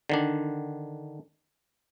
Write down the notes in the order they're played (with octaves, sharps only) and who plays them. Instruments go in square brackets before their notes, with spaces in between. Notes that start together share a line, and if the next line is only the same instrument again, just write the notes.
[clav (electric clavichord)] D3 D#3 D4